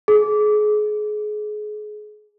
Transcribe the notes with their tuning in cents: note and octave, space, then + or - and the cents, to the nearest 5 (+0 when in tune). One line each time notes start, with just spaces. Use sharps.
G#4 +30